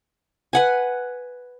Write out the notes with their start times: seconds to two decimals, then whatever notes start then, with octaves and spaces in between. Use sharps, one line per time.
0.53 B4 F#5 G#5